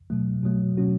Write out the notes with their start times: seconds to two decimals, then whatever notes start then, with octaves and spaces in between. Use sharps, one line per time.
0.10 B2 F#3 A3
0.43 B2 F#3 A3
0.77 B2 F#3 C#4 F#4